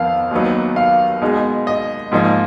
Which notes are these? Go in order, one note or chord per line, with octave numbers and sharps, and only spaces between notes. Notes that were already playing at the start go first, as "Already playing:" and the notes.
Already playing: F2 D#3 B3 F5
D#2 D#3 F#3 B3 D#4
F5
B2 G#3 D#4
D#5
G#2 F3 A#3 D#4